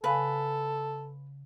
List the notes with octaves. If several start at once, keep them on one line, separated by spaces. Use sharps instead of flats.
C#3 A4 B4 F5 G#5